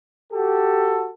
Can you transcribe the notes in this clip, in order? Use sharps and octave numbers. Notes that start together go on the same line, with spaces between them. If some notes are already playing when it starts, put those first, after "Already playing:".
F#4 G4 A4